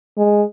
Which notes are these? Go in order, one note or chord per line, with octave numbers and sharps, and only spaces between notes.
G#3